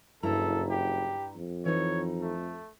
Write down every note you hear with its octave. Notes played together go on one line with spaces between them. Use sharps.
F#1 G2 E4 A4 A#5
G4
F2
E3 D#4 C#5
A3